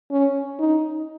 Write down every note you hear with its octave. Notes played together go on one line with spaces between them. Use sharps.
C#4
D#4